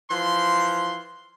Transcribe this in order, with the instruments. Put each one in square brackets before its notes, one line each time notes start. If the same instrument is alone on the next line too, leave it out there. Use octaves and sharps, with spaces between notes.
[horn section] E3 F3 C6